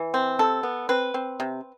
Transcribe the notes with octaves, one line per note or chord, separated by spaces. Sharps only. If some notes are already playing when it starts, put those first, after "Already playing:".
Already playing: E3
C4
C3 A4
B3
C4 B4
C4
C3